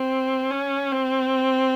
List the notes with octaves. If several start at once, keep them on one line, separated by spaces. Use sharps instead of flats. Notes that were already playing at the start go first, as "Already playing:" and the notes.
Already playing: C4
C#4
C4